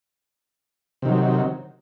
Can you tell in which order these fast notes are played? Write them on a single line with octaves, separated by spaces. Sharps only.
C3 D#3 F#3